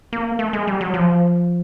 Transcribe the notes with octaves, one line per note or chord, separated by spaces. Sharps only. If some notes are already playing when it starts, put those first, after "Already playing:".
A#3
A3
G#3
G3
F#3
F3